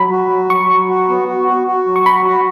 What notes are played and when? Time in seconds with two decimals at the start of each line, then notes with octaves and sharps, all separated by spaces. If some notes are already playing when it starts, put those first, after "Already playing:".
Already playing: F#3 B5
0.12 F#4
0.31 F#3
0.50 F#3 C#6
0.70 F#3
0.89 F#4
1.09 B3
1.28 F#4
1.48 F#4
1.67 F#4
1.86 F#3
1.96 C#6
2.06 F#4 B5
2.25 F#4